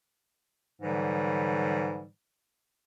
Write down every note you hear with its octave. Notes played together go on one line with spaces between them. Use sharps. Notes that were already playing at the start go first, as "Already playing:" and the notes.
G#2 D3 E3 F#3 G3